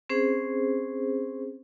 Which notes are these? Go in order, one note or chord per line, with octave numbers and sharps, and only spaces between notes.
C4 C#4 G#4 C5